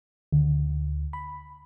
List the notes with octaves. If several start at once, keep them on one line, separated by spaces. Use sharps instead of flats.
D2
B5